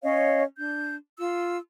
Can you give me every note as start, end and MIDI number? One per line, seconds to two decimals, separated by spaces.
0.03 0.43 61
0.03 0.43 73
0.03 0.43 75
0.03 0.43 77
0.58 0.95 62
0.58 0.95 91
1.17 1.57 65
1.17 1.57 88